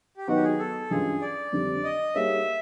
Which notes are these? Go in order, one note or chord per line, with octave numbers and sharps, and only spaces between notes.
G4
D#3 F#3 B3 D#4 F#4
G4
G#4
A4
G2 E3 G#3 C#4 F4 G#4
D5
F2 D3 G3 C4
D#5
G3 A#3 D#4 G#4 C#5 E5